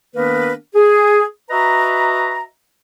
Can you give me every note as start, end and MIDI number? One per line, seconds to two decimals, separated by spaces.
0.16 0.53 51
0.16 0.53 58
0.16 0.53 59
0.16 0.53 62
0.16 0.53 70
0.16 0.53 71
0.74 1.23 68
1.50 2.43 66
1.50 2.43 71
1.50 2.43 75
1.50 2.43 76
1.50 2.43 82